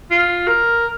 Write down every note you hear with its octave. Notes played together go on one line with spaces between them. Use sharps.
F4
A#4